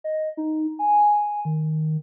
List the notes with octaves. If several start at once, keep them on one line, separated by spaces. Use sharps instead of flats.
D#5
D#4
G#5
D#3